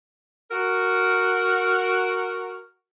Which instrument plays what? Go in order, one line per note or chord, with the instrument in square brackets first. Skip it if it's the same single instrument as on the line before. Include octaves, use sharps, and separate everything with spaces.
[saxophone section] F#4 A#4